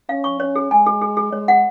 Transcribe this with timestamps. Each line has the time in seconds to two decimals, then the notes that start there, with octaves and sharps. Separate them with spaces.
0.09 C#4 F5
0.24 C#6
0.40 C#4 C#5
0.56 G#4
0.71 G#3 G#5
0.87 G#4
1.02 G#4
1.17 G#4
1.32 G#3 C#5
1.48 F#5